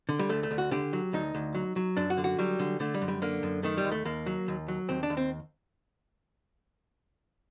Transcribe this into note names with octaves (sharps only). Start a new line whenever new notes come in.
D3
G3
D2 A3
A3
D2
F#4
D3 G4
F#3
D2 D#4
D2
F#3
F#3
F#2 D4
F#4
D3
F#4
F#3 G3
D3
D3 A3
G3
F#2
G3
D3 A#3
F#2
D#3 A3
G3
D#2
A3
D#2 A#3
F#3
D#2
F#3
D#2 C4
D4
D#2
C4